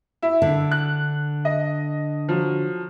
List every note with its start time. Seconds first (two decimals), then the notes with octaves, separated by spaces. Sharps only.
0.22 E4
0.42 D3
0.72 F#6
1.45 D#5
2.29 F3 F#3